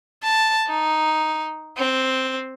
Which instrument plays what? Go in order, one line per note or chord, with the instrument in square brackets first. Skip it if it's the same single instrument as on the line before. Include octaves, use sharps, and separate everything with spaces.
[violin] A5
D#4
C4